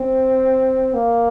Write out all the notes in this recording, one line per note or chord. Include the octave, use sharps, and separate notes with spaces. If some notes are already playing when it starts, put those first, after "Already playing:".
Already playing: C4
A#3